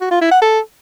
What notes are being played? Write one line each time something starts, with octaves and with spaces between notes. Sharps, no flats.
F#4
F4
E4
F#5
A4